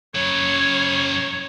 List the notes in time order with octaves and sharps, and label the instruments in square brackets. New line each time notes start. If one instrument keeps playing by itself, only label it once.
[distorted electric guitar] C#3 F#3 [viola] C#5